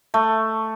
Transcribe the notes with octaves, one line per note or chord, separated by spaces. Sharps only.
A3